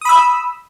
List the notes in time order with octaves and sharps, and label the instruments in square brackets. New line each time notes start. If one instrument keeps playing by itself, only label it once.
[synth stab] D#6
B5
E6